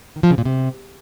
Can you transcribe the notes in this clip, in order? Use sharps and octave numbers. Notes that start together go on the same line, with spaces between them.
D#3
F3
C#3
A#2
C3